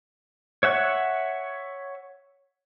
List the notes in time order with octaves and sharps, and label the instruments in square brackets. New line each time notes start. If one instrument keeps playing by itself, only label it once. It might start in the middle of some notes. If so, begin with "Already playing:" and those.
[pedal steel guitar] C#5 E5 F#5 C#6